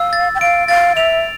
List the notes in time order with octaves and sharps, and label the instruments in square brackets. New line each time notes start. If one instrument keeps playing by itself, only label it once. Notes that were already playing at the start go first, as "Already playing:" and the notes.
Already playing: [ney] F5 [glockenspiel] E6
[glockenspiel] A6
[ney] G5
[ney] F5 [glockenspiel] D7
[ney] F5 [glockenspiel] A6
[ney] E5 [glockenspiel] F7